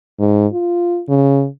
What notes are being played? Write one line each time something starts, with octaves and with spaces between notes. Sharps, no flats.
G#2
F4
C#3